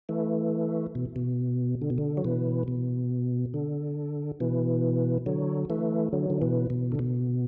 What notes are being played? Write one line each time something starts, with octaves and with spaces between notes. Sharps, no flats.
E3 A3
B2
B2
D3
B2
D3
F#3
B2 E3
B2
D3
B2 E3
D3 F#3
E3 A3
D3 F#3
D3
B2 E3
B2
D3
B2